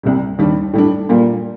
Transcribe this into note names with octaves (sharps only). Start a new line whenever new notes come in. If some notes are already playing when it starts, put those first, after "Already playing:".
C2 C3 G3
D#2 D#3 G3 D4
A2 G3 D4
A#2 G3 A#3